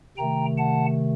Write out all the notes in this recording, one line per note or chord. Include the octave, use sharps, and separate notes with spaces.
C3 D#3 A3 G5 A#5
F#5 A5